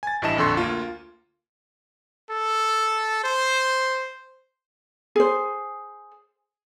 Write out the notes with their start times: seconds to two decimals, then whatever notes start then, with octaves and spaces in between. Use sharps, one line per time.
0.03 G#5 A6
0.22 A1 G2 E4 D#5 A5 E7
0.37 A#1 F2 D3 A4 C6 C#6
0.57 D2 A#3 F4
2.30 A4
3.24 C5
5.16 G#4 C5